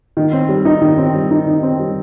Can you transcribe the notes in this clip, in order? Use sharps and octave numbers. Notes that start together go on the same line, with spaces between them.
D#3
C4
G3
D#4
D#3
C4
G3
D#4
D#3
C4
G3